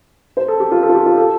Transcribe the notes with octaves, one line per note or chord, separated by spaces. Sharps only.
C5
A4
G4
F4
A4
F4
G4
F4
A4